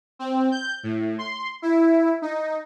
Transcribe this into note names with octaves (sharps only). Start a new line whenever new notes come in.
C4
G6
A2
C6
E4
D#4